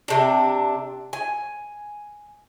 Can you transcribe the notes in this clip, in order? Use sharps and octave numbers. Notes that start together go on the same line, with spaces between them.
C3 D4
G#5